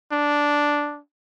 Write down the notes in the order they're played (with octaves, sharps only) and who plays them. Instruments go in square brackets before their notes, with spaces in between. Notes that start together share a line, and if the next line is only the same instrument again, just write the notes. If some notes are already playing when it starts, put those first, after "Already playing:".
[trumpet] D4